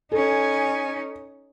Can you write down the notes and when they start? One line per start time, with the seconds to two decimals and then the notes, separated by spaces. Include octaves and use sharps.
0.12 C#4 D#4 A4 G#5